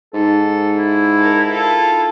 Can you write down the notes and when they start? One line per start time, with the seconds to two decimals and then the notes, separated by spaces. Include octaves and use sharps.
0.14 G#2 A4
0.77 E4
1.18 A4 A#4
1.48 F4 A4